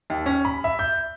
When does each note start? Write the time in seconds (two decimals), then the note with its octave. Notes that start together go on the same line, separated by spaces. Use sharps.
0.10 D#2
0.26 C#4
0.45 B5
0.64 E5
0.79 G6